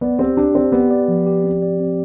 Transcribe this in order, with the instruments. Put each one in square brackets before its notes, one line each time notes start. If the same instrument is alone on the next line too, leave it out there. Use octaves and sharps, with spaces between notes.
[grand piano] B3 [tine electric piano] D5
[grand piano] C4 [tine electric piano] G4
[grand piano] D4 [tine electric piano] G4
[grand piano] C4 [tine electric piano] D5
[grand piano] B3 [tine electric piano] G4
[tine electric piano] D5
F3
G4
C4
D5
C4